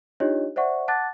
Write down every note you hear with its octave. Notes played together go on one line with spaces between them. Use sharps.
D4 D#4 F4 G4 C#5 D#5
C5 D5 E5 F#5 C#6
F#5 A5 D6 F#6 A6